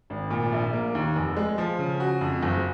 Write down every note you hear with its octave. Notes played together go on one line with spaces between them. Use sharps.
G#1
A#2
A#1
A#3
D#2
F1
G#3
F3
C#3
F#4
F2
F#1